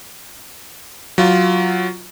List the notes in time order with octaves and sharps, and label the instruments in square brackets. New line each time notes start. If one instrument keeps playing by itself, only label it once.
[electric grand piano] F#3 F4